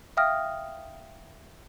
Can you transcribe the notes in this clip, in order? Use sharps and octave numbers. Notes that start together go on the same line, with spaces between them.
E5 F5 G5 D#6 F6 A#6